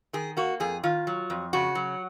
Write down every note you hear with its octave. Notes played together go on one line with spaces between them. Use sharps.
D#3 G#4
A#3 F#4
F2 G#4
D#3 F4
F#3
F2
C#3 F#4
F#3